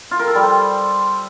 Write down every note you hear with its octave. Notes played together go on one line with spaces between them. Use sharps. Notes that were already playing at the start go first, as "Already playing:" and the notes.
F4
A#4
A4
G3
C5